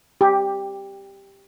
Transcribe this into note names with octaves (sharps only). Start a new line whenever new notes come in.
G4